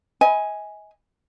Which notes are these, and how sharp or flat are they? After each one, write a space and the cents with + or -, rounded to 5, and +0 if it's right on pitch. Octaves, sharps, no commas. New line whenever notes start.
D#5 +40 G#5 +0